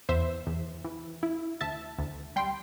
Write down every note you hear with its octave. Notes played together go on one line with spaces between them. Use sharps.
E2 C5 E5
E2
E3
E4
D2 E5 A5
D2
G3 G5 C6